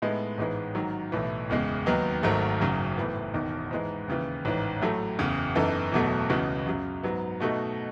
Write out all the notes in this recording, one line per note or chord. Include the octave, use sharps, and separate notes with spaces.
A2 G#3 B3 D#4
A1 G#2 E3 G#3 B3
G#2 D#3 F#3
B1 A2 E3
F#1 E2 C#3 G#3
D#2 D#3 F#3 B3 D#4
G#1 G#2 D#3 F#3 A3
F#1 F#2 C#3 F#3
A2 E3 B3
E1 E2 D#3
G#2 E3 G#3
D#2 C#3 E3
A1 G#2 E3
A2 F#3 A3
F#1 E2 C#3
F#2 E3 B3 D#4 A4
E1 E2 B2 F#3 A3
C#2 C#3 E3 B3 F#4
F#2 C#3 F#3
G#2 F#3 B3
B2 A3 D#4 F#4